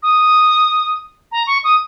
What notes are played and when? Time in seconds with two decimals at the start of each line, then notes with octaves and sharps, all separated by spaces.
0.03 D#6
1.32 A#5
1.47 C#6
1.64 D#6